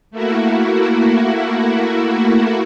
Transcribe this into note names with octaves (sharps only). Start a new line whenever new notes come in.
A3 A#3 E4 F#4